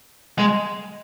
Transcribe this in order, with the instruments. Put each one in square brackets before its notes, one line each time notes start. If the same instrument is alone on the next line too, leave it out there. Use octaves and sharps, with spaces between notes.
[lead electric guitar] G#3